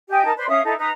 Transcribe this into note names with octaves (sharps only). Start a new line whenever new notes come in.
G4 D#5 G5 G#5
D#4 A#4 A5
B4 C5 D5 C6
C#4 E5 F5 D#6
D#4 E4 A4
D#4 B4 A#5